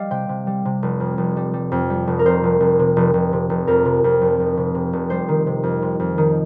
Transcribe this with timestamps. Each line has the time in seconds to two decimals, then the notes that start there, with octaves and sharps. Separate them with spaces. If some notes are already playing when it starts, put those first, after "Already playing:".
Already playing: G3 D#5 F5
0.11 C3 G5
0.29 C3
0.47 G3
0.65 C3
0.82 F1
1.00 F2
1.18 F1
1.37 G3
1.54 G3
1.72 F2
1.90 G3
2.07 F1
2.19 A#4
2.25 F1 C5
2.44 F1
2.60 F1
2.79 C3
2.96 F1
3.14 F1
3.33 C3
3.50 F1
3.67 F2 A#4
3.85 C3
4.04 F2
4.21 F1
4.40 F1
4.57 C3
4.75 C3
4.93 F1
5.10 G3 C5
5.29 D#3
5.47 C3
5.63 F2
5.82 C3
6.00 F2
6.18 D#3